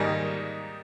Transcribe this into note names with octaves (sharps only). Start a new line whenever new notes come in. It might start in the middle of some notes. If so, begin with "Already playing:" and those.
Already playing: G#2 D#3 G3 A#3 D#4